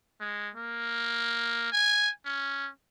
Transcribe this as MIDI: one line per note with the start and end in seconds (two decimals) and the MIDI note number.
0.20 0.49 56
0.56 1.72 58
1.72 2.10 80
2.25 2.69 61